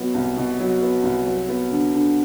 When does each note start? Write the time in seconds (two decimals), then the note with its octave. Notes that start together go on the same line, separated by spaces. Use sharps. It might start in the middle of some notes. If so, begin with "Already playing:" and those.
Already playing: B2 F#3 B3
0.14 C2
0.37 B2
0.59 F#3
0.82 B3
1.03 C2
1.25 F#3
1.48 B3
1.71 D3
1.93 D3